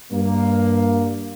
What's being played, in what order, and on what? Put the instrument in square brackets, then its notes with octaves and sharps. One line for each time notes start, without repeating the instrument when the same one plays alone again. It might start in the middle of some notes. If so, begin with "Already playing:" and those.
[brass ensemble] G2 A#3